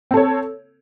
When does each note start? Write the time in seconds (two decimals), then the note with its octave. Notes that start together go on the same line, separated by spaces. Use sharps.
0.11 C4
0.14 A4
0.17 C#5